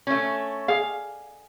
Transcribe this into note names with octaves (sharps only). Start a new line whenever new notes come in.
A3 C#4
G#4 D5 F5